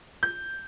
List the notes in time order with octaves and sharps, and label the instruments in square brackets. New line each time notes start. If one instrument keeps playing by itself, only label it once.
[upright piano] G6